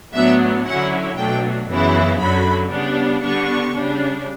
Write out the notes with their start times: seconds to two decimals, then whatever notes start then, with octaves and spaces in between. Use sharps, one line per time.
0.14 A2 F#3 B3 D4 E5
0.65 D3 F#3 C#4 E4 F#5
1.17 B2 F#3 A3 D4 G5
1.69 F#2 C#3 E3 B3 E4
2.19 F#2 D3 F#3 B5
2.71 C#3 G3 B3 D4
3.22 D3 G3 B3 D4 C#6
3.74 C#3 G3 D4